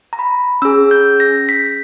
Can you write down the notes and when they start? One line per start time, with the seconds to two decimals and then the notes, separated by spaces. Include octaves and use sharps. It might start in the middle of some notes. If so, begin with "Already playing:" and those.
0.13 A#5
0.19 B5
0.62 C#4 G#4 E6
0.91 G6
1.20 A#6
1.49 B6